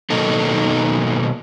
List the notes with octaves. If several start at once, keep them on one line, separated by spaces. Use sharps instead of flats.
B2 D#3 F#3 A#3 D#4 A4